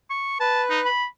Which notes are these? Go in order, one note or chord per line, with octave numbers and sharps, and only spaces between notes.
C#6
B4 A5
D#4
B5